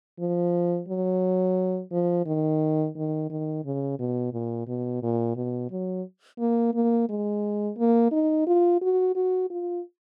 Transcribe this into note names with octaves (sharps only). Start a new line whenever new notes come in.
F3
F#3
F3
D#3
D#3
D#3
C#3
B2
A#2
B2
A#2
B2
F#3
A#3
A#3
G#3
A#3
D#4
F4
F#4
F#4
F4